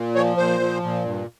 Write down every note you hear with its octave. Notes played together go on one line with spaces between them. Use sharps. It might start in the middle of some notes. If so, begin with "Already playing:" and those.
Already playing: A#2
F3 C#5
A#2 C5
F3
A#2
G2